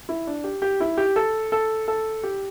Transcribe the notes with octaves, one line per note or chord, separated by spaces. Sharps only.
E4
D4
G4
G4
E4
G4
A4
A4
A4
G4